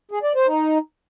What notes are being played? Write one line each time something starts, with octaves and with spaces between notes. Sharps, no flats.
G#4
D5
C5
D#4